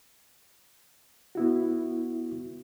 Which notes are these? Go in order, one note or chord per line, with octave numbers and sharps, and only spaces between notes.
B3 E4 F#4